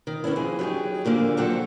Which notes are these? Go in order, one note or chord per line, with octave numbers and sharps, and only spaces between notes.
D#3
D3 B3 C#4 D4 E4
F2 G#4
F#3 D#4 F4 G4 G#4
F2 A#2 D3 A#3
F2 F#3 C4 A4 F#5